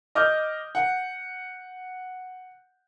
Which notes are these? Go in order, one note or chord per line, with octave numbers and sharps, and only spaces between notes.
D#5 D6 D#6 F6 G6
F#5